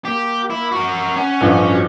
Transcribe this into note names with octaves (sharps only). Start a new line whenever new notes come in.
A#3 G4
E4
F#4 A#4
C#4 F#5
A1 G2 F3
F#4